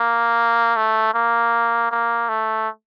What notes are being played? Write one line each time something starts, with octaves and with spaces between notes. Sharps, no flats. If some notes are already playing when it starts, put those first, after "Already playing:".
Already playing: A#3
A3
A#3
A#3
A3